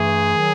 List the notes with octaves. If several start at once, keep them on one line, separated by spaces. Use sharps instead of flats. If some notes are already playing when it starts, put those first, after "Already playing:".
Already playing: G2 E3 A3 G#4
D#3 F#3